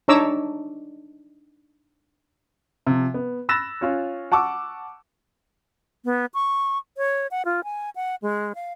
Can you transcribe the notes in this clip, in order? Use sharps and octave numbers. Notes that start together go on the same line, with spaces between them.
D4 D#4 C#5 A#5 D6 E6
C3 F3
B3
B5 E6 F#6 A6 A#6 E7
C#4 F4 C#5
F#5 A5 C#6 D6 E6
B3
C#6
C#5
F#5
F4
G#5
F#5
G#3
F5